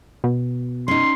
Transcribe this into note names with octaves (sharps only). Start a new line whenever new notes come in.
B2
C#4 D#4 C6